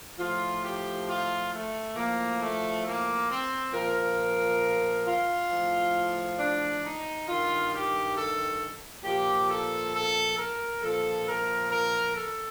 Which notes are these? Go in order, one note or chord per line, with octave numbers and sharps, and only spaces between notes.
A2 F3 F4
G4
F4
A3
A2 F3 A#3
A3
A#3
C4
A#2 F3 A#4
F4
A2 F3
D4
D#4
G2 D#3 F4
G4
A4
A#2 F3 G4
A4
A4
A#4
A#2 F3 A4
A#4
A#4
A4